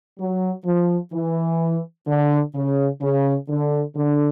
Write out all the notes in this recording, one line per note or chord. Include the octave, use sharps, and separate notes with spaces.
F#3
F3
E3
D3
C#3
C#3
D3
D3